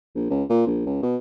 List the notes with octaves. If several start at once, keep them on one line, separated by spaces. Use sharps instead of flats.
A#1
C#2
A#2
A#1
C#2
B2